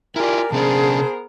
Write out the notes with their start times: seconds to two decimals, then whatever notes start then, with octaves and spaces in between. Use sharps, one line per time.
0.16 E4 F4 G4 A#4 D5 G#5
0.52 C3 B3 C#4 D4 G#4 A#4 C5 A5